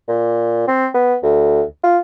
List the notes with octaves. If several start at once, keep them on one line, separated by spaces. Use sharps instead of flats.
A#2
C4
B3
D2
F4